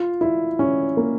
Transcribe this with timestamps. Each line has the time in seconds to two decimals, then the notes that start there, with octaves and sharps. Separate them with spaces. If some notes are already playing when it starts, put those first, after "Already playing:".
Already playing: F4
0.21 E4
0.59 C#4
0.97 A#3